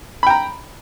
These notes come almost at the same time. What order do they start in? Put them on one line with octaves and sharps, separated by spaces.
B5 G5 A#5